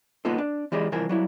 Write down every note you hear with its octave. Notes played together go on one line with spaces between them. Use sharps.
A#3 B3 D#4 F4 A4
D4
E3 G#3 G4 G#4 D5 D#5
C2 E3 F3 A#4 G#5
F#3 G3 E4